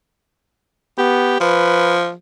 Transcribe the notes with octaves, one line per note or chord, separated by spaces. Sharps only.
B3 G4
F3 B4